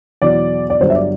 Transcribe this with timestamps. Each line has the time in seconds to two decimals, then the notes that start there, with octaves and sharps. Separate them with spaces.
0.22 E2 B2 F#3 D5
0.70 D5
0.80 G1 G2 D3 F#3 C5
0.90 E5
0.95 D5